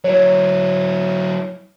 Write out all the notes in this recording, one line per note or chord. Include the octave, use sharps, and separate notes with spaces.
F#3 E4 C#5